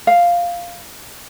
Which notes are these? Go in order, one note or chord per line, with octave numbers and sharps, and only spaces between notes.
F5